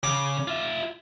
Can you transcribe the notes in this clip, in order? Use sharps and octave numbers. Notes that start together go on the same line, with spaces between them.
C#3 D6
F4 E5